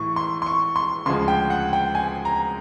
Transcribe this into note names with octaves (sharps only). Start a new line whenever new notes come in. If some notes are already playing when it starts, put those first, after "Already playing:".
Already playing: A2 E3 C#6
C6
C6
C#6
C6
D2 C#3 F3 G#3 C6
G5
F#5
G5
G#5
A#5